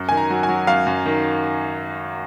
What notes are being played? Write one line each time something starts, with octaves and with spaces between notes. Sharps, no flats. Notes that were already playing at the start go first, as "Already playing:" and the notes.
Already playing: F#2
D#3 G#5
A#5
F#3
G#5
F#3
F#2 F5
F#2
D#3